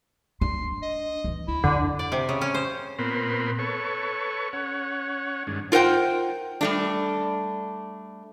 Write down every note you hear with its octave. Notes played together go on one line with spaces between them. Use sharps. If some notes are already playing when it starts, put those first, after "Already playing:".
D4 C6
D#5
E3 D4
D2 E4
F2 D3
D5
C3
C#3
C#4
C5
A#2 B3 C4 A#4 B5 C6
A4 B4 C#5 C#6
C#4 C#5 F#5
G2 D#3 G#3 C#4 D4
F4 A#4 C5 F#5 G5
G3 A3 D4